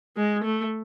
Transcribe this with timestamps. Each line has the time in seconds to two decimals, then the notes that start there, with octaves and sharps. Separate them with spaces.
0.17 G#3
0.44 A3